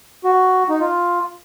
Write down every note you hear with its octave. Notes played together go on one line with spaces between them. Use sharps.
F#4
D#4
F4